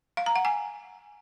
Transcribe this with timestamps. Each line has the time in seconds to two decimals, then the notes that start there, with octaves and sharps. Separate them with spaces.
0.17 F5
0.26 A#5
0.36 F#5
0.45 G#5